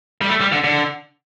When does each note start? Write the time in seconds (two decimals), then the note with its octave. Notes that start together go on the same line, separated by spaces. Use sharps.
0.21 G3
0.29 A3
0.41 G3
0.52 D3
0.64 D3